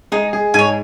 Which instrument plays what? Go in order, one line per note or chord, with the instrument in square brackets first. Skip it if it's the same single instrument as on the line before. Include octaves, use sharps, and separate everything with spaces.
[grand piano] G#3 G#4 [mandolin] D#4
[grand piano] G#3 G#4
[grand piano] G#2 G#3 [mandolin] C#5 G#5